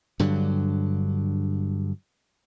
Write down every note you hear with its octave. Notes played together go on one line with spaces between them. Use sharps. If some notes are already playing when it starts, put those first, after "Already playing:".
G2 D3 F#3